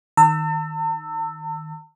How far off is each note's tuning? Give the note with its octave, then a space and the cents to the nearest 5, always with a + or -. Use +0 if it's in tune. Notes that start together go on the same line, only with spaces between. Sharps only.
D#3 +0 A5 +45 E6 +0